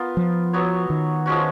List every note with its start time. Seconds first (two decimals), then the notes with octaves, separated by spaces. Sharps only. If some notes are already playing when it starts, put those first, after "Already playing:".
Already playing: B3 F4 A#4
0.17 F3
0.53 F#3 B3 F#4 C#5
0.90 D#3
1.26 F3 G#3 C#4 F#4